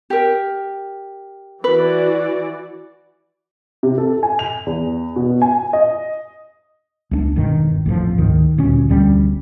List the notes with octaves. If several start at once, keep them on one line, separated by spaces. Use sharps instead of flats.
G4 A#4
E3 F#4 B4 D5
C3
A4
G#5
F7
E2
B2
G#5
D#5
C#2 A3 D4
E1 G2 B2 D#3
A1 F2 A2 F3
D2 G#2 D#3
D#1 D2 A#2 C#4
E1 D2 G3 C#4